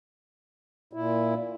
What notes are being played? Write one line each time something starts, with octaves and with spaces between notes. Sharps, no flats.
A#2 E4